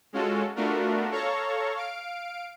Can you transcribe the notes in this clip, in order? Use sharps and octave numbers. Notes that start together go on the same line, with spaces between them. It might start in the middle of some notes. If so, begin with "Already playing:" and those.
G#3 C#4 F4 F#4 A4
A3 B3 D4 F4 F#4 A#4
A4 C#5 F5 A#5 C#6
F5 D7